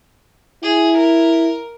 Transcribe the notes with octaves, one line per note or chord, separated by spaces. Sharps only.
E4 G#4
A#4